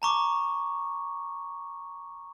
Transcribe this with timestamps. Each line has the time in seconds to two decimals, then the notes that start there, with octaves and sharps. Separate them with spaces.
0.02 A5 A#5 C#6 D6